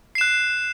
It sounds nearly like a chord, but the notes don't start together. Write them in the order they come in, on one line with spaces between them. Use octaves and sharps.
C7 E7 F#6